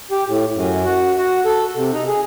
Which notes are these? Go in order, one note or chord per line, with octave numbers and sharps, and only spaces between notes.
G4
A2
F#2
F#4
F#4
A4
C3
D#4
G#4